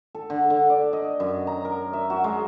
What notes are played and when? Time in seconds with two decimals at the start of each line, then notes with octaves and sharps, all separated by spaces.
0.15 A4
0.30 D3
0.50 D3
0.70 D5
0.93 D#5
1.20 F#2
1.47 A#5
1.65 A#4
1.93 E5
2.10 F#4
2.24 G#3